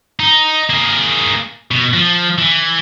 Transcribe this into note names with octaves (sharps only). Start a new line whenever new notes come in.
D#4
A#3 G#4
B2
F3
E3